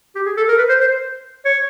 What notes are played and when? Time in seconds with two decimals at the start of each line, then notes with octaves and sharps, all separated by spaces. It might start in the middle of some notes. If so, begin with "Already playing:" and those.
0.16 G4
0.26 G#4
0.37 A4
0.48 A#4
0.58 B4
0.69 C5
0.81 C5
1.45 C#5